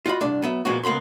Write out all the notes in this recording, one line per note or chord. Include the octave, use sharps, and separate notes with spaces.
F4 F#4 D#5 B5
C2 G2 D4 D5
F#3 B3 E5
A#2 F3 G#3 A#3 B3 F#4
C#2 A#3 B3 B5 C6